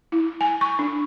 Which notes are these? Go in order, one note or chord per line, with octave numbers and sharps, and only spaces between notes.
E4
G#5
C#6
D4